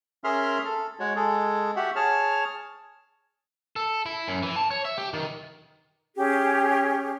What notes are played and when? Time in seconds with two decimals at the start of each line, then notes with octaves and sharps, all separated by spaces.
0.24 C#4 G#4 A#4 E5 C6 F6
0.65 A4
0.99 G#3 F#4 C#5
1.16 G#3 G#4 A4
1.76 F#4 G4 E5 F#5
1.96 G#4 C#5 A5 F6
3.76 A4
4.06 E4
4.28 F#2
4.43 E3
4.56 A5
4.71 C#5
4.85 E5
4.98 G4
5.14 D#3
6.15 C#4 G4 G#4